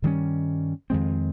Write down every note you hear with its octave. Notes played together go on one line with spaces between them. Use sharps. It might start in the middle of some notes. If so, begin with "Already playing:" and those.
G2 D#3 G3 C#4
F2 D#3 G#3 C4